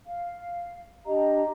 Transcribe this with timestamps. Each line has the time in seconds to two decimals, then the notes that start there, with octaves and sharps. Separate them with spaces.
0.05 F5
1.06 D4 G4 D#5 A#5